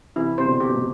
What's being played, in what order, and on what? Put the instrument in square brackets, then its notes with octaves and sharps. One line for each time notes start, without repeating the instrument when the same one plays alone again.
[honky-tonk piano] C3 E3 [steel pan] E4
[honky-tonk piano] C3 [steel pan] C5
[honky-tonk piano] B2 D3
[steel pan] G4
[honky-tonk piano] B2
A2 C3